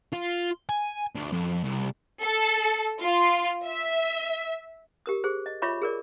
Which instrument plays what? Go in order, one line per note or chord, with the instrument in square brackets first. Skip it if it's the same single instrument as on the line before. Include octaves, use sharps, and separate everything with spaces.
[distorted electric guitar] F4
G#5
D2
F2
C2
[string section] A4
F4
E5
[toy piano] G4 A#4 D#6
G4 G#4 C5
D#5
F4 C#5 E5 B5 C#6 D6
G#4 A#4 D5